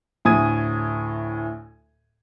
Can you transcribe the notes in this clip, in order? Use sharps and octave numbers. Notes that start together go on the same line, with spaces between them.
D2 A2 G#5 D#6 G#6 D#7